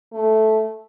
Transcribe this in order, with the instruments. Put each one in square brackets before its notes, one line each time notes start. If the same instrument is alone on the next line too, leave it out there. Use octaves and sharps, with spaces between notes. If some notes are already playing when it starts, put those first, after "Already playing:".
[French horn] A3